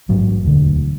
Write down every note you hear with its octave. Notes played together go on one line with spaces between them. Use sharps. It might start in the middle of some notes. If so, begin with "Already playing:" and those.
A1 G#2 F#3
E1 D2 D3